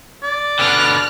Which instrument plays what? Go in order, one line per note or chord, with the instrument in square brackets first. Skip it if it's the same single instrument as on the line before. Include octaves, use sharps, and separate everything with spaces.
[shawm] D5
[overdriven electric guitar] B2 D3 [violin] F6 F#6